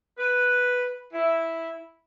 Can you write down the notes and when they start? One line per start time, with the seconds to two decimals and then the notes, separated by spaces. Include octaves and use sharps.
0.18 B4
1.14 E4